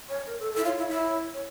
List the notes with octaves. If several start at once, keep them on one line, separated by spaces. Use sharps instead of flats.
C#5
A#4
A4
A4
E4
F4 C#5
E4
E4
C#5